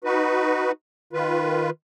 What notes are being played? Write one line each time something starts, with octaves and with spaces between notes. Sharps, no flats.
D#4 F#4 B4
D#3 F4 B4